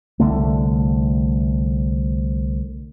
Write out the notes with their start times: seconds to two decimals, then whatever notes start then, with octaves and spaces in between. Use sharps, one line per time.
0.20 C2 D3 A3